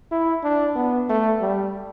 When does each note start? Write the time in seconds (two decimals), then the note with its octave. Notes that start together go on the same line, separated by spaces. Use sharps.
0.11 E4
0.43 D4
0.75 B3
1.09 A3
1.41 G3